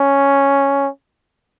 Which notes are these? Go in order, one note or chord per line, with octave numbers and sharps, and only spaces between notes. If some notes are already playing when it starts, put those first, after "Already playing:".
Already playing: C#4